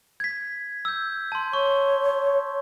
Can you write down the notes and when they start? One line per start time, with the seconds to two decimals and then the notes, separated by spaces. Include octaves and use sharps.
0.20 G#6 B6
0.85 E6 G6
1.32 A5 C6
1.53 C#5 C#6